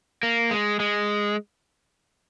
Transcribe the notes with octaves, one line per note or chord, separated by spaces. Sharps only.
A#3
G#3
G#3